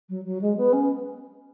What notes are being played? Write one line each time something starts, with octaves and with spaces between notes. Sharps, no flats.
F#3
F#3
G#3
B3
C#4